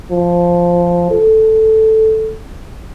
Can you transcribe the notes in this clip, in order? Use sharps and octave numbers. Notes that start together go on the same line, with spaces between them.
F3
A4